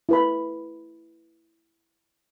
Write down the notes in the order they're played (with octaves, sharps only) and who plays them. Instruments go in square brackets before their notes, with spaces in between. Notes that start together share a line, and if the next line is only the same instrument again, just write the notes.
[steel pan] E4 B4 B5